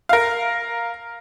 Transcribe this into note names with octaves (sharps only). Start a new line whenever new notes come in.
A#4 F5